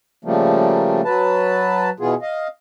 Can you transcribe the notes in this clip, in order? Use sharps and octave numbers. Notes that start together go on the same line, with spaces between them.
C#3 F3 G3 A3 A#3
F#3 B4 A5
B2 E3 B3 F4 G#4
D#5 F5